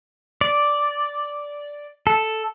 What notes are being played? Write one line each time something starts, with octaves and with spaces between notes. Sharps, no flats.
D5
A4